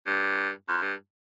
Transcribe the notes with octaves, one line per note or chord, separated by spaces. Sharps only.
G2
F2
G2